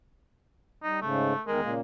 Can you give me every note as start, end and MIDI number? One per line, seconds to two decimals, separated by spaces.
0.83 1.00 55
0.83 1.00 63
1.02 1.33 44
1.02 1.33 49
1.02 1.41 57
1.47 1.60 40
1.47 1.60 51
1.47 1.72 56
1.47 1.60 70
1.63 1.81 46
1.63 1.81 49
1.63 1.81 58